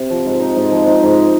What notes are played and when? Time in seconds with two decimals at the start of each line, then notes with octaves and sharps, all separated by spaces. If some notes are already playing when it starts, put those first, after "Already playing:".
Already playing: C3
0.10 F3
0.26 G#2
0.40 D#4
0.56 G#2
0.71 F3
0.87 D#4
1.03 G#2